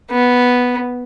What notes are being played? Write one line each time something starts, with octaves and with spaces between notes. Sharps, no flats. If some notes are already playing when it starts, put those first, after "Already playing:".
B3